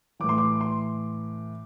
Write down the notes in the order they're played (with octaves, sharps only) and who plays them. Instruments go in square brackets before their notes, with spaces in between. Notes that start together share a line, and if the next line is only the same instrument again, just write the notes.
[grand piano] A2 E3 D6
C6
D6
C6